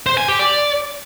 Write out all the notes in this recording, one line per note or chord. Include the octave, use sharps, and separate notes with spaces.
C5
G#5
G4
D5